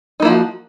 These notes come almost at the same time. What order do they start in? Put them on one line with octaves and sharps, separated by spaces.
D#4 A#3 E4 F3 F#4